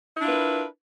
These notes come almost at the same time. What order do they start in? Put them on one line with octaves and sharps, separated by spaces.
E4 D4 F4 B4 A#4